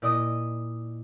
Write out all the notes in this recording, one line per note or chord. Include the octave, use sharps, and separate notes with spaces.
A#2 E4 D5 D#5 D#6 D#7